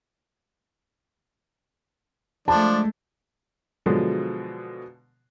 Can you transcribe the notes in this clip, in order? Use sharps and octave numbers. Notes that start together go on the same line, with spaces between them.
F3 G#3 A3 D4 A5
B2 D3 F3 F#3 G#3